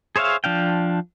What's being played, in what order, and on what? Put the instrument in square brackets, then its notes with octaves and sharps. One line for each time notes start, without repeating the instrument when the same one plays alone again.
[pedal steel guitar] G#4 C5 C#5 E5 F5
F3 D4 F5 G5